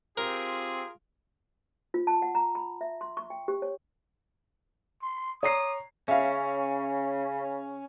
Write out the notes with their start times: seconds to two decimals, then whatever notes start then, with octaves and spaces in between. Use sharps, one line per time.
0.17 C4 F4 G4 G#4 A#4
1.94 F4
2.07 A5
2.22 F#5
2.35 A#5
2.55 B5
2.81 E5
3.01 C6
3.17 C#6
3.30 G5
3.48 G4
3.62 C#5
5.02 C6
5.43 C#5 A#5 D#6 C7
6.08 C#3 C#4 E5 F5